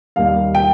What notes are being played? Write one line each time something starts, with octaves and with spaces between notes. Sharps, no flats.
D#2 D#3 G3 F5
G5